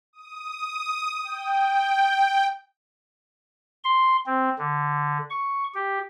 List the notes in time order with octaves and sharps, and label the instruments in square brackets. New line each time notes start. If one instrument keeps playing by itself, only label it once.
[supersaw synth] D#6
G5
[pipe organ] C6
C4
D3
C#6
G4